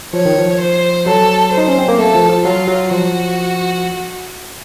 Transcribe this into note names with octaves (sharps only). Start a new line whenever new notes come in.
F3 C#5
D#3
F3
C5
F#3 A4
C5
D#4
C#4
C4
A#3
A3 A4
F3
F3
F#3 F4
F#3
F3 F#4